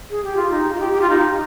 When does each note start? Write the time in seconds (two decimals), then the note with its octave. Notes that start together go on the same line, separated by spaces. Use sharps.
0.10 G#4
0.24 G4
0.36 F4
0.50 D#4
0.74 F4
0.80 G4
0.92 G4
1.01 F4
1.09 D#4